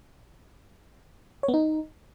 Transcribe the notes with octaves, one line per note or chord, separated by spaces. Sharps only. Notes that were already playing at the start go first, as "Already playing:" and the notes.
C#5
B3
D#4